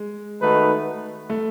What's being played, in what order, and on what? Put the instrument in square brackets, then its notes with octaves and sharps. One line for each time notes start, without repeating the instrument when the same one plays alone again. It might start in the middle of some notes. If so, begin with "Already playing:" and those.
Already playing: [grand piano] G#3
[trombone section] D#3 A3 D#4 F#4 B4
[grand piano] A3